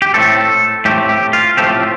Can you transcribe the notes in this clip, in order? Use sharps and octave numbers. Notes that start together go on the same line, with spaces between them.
G4
A2 A3 C4 A4
A2 A3 C4 G4
G4
F4
A2 F3 A3 C4 G4